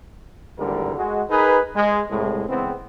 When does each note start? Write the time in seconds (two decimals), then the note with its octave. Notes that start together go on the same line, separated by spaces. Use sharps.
0.58 G#1 E2 A2 D3 G3 A#4
0.97 G#3 F#4
1.30 D#4 G#4 A#4 B4
1.75 G#3
2.10 C2 A2 G#3
2.48 C#3 E3 G#3 B3 C4